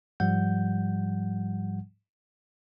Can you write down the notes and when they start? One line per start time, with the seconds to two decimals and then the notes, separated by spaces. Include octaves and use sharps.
0.20 G#2 F3 G3 F#5 G6